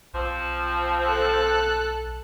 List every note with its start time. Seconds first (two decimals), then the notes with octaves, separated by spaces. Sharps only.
0.14 B1 F3 C4
1.06 A4 F#6